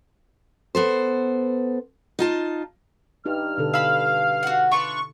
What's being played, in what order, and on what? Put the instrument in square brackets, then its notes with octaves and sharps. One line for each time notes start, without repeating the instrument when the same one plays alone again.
[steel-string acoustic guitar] B3 A4 C5
D#4 F4 A5
[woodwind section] G2 F6 [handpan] D#4 G4
[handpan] B2 D3 A4
[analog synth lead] F5 [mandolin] B5 E6
[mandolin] F#4 F#5
[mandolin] D4 F4 B4 [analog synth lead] C#6